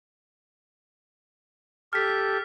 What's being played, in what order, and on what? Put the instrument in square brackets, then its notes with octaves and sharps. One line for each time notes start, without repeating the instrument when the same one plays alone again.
[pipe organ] G4 A4 [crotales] F6 B6